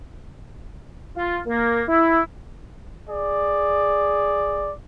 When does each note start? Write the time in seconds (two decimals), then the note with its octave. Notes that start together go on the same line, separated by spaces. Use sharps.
1.17 F4
1.46 A#3
1.88 E4
3.09 G#4 D5